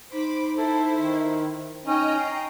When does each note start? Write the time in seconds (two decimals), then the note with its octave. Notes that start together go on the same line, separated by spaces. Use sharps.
0.12 D#4 C5 B5 D6
0.57 E4 A4 C5
0.96 D#3
1.86 C#4 D#4 D#5 G5 A#5
2.18 C7